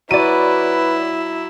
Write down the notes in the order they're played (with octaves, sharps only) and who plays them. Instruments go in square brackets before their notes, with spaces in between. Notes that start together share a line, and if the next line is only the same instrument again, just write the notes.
[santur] F#3 [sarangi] E4 [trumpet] B4 [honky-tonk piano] D5 D#7